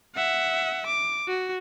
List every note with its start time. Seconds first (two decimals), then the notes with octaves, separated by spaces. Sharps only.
0.15 E5 F#5
0.86 D6
1.28 F#4